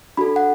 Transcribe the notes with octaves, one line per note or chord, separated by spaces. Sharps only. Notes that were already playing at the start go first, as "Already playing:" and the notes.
D4 F#4 A4 B5
F#5